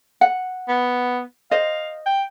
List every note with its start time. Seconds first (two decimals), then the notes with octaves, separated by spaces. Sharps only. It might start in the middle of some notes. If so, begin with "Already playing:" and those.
0.21 F#5
0.68 B3
1.51 C5 D#5 F5
2.06 G5